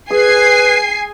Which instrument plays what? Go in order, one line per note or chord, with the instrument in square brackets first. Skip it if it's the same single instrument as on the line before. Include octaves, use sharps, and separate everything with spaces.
[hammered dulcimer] G#4 [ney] B4 [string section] G#5 C7